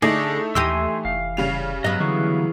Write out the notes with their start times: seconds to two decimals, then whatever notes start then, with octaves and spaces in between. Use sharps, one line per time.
0.02 D3 A3 D#4 E4 G#4 D5 D#5
0.55 D#2 E3 G4 D#5 G#5 C6 E6
1.05 F1 F5
1.37 C#3 G3 F7
1.84 G2 F#3 B3 D#5
2.00 D3 E3 G#4 C#6